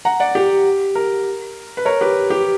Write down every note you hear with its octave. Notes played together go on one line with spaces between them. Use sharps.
F#5 A#5
D5 F#5
G4
A#4
B4
A#4 C#5
G4 B4
G4